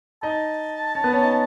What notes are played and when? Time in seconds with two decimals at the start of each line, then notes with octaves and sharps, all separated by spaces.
0.23 D#4 D#5 A5
0.95 C#4 C#5
1.04 B3 B4
1.13 C#4 C#5
1.22 D#4 D#5